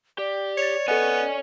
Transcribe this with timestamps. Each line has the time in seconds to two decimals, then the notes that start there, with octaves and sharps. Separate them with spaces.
0.18 G4 D5
0.58 C#5 A6 F7
0.88 B3 A4 C#5 D#5 G#5 C#7